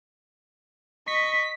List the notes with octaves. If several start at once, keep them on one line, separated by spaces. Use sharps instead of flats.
D#5 C#6 B6